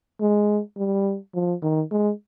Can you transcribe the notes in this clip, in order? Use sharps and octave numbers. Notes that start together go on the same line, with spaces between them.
G#3
G3
F3
D#3
G#3